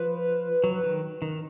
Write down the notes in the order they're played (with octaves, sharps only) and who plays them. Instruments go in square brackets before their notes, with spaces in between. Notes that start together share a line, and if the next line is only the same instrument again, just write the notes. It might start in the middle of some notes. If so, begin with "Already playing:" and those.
Already playing: [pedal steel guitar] F3 [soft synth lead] B4
[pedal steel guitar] F#3
D#3
D#3